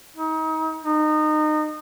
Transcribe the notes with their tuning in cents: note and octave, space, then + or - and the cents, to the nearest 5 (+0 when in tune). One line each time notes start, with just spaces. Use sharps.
D#4 +35
D#4 -25